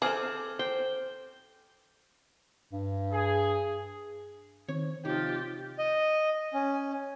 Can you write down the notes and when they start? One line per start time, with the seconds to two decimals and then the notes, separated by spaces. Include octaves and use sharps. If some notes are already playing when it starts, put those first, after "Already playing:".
0.02 C4 G#4 A4 D6 F6
0.59 C5 G5
2.73 G2
3.12 G#4
4.69 D#3 C4 C#5
5.05 C3 F3 D#4 F4 G4
5.78 D#5
6.53 C#4